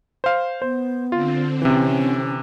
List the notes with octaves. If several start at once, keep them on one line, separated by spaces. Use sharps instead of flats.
C5 F5
B3 C5
D3 C4 F4
C3 E3 C#4